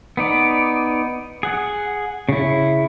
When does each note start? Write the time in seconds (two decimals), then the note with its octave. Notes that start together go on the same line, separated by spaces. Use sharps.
0.17 B3 D#4 D5
1.43 G#4 F#5
2.29 C#3 E4